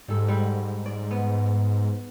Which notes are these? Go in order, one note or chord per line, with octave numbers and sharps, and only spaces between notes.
G#2 G3 A4
G3 F#5
D5
B3